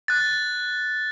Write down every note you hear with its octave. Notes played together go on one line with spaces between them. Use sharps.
F#6 A6